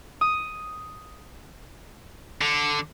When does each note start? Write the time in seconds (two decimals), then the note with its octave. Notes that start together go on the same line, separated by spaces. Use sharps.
0.21 D#6
2.42 D3